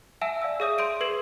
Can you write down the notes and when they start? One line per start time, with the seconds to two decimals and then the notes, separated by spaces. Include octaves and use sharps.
0.21 E5 F#5 G#5 A5 E6 E7
0.42 D5 F5 E6
0.60 G#4 C#5 E5 D#6 G6 D#7
0.78 C6 G6 D7 D#7
1.01 G#4 B4 E6 G#6 C7 E7